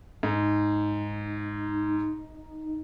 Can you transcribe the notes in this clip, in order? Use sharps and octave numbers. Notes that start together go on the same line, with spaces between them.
G#2 D#4